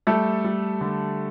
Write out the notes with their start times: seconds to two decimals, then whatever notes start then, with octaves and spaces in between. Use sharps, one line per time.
0.07 G3 A3 A4
0.44 G3
0.81 D3